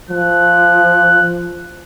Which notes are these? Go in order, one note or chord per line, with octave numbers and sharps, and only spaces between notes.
F3 F#6